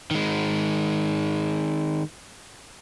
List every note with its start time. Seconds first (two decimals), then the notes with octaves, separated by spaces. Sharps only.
0.11 D#3 G#3